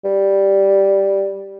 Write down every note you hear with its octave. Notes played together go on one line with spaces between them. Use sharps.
G3